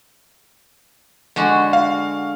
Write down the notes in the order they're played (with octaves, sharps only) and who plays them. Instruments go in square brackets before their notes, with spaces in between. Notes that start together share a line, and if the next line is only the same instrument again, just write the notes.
[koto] D3 G#3 F#4
[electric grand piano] F5